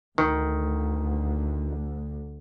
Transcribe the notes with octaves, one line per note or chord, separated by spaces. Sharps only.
D2 D#3